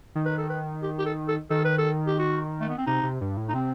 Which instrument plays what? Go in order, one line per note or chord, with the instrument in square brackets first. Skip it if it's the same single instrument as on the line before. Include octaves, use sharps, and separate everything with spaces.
[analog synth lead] D#3
[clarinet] B4
A4
B4
G4
G4
A4
A4
[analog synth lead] D#3 [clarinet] A4
[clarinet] B4
A4
G4
F#4
A3
B3
C4
[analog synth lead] C3 [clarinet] D#4
[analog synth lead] C3
G2
A2
[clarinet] D#4
[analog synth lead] C3 [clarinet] C4